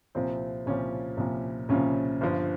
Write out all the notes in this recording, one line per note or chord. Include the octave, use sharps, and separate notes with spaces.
C2 A#2 F3 C4
C2 A#2 C#3 F3 C#4
C2 A#2 F3
C2 A#2 C#3 F3 C#4
G1 G2 F3